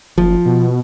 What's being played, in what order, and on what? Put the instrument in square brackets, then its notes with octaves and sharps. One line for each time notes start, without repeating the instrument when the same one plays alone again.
[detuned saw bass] F#1 [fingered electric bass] F3
[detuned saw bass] B2